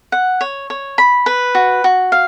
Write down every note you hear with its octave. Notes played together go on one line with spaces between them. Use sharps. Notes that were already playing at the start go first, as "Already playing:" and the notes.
F#5
C#5
C#5
B5
B4
F#4
F#4
F5